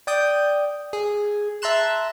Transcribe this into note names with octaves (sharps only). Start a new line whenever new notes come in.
D5 G5 D#6 G6
G#4
E5 A5 A#5 C6 F#6 E7